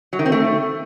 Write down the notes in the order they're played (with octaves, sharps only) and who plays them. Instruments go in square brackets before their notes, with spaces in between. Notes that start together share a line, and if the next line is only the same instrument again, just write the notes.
[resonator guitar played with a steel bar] F#3
D#3
C4
A3